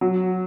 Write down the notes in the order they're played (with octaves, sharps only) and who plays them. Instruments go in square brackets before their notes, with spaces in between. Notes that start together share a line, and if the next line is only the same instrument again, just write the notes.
[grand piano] F#3